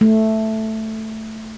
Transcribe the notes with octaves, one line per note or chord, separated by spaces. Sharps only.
A3